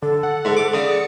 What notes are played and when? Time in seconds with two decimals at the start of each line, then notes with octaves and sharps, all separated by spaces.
0.02 D3 A4
0.23 F#5
0.45 G#2
0.57 D6
0.74 C#3 D5 D#6
0.91 C#7